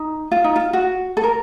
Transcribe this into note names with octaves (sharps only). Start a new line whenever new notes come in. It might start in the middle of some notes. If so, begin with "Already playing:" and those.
Already playing: D#4
F4
D#4
F4
F#4
A4
A#4